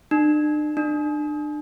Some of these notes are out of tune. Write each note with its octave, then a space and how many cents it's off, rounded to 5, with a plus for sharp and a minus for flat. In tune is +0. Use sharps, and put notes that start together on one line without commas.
D4 +40
D4 +35